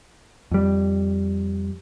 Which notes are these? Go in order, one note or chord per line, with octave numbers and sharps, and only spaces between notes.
F2 G3